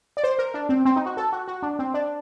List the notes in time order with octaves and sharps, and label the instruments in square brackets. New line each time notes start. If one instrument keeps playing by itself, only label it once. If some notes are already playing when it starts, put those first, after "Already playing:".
[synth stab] D5
C5
A#4
D4
C4
C4
D#4
F#4
A4
F#4
F#4
D4
C4
D4